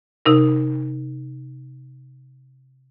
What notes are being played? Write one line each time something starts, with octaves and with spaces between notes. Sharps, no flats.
C3 D#4 A#4